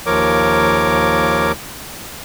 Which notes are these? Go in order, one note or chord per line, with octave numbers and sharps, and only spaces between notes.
D#2 F3 A#4 C#5 D6